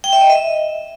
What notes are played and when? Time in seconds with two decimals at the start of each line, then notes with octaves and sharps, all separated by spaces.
0.04 G5
0.13 E5
0.21 D#5
0.30 E5